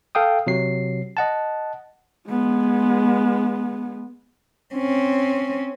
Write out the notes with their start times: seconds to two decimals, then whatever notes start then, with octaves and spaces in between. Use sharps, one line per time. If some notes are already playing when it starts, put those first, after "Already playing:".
0.15 A4 F5 G5 D#6
0.47 C3 F#3 C7
1.17 D#5 F#5 A5
2.28 G#3 B3
4.75 C4 C#4